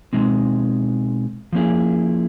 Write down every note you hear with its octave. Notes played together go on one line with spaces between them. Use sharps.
B2 G#3 C4 D#4
F3 A#3 C#4 E4 G#4